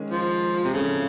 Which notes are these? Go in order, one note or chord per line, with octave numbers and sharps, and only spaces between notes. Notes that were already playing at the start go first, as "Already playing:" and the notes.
Already playing: D#3 G#3 C#4
F3
C3
A2 C#3 F3 A3 C4 F4